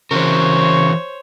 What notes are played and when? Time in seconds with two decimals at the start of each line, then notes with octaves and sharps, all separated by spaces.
0.11 C#3 E3 F#4 A#4 C5 C#5 C#6